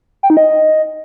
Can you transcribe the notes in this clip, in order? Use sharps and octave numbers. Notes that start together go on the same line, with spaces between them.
G5
D#4
D#5